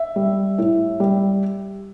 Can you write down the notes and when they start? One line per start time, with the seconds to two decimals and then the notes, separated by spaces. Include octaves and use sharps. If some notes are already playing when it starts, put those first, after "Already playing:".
Already playing: E5
0.16 G3
0.58 A2
1.00 G3